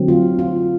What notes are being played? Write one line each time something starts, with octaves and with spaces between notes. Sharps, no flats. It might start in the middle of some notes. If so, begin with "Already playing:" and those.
Already playing: D3 F#3 A3 C4
F4
F4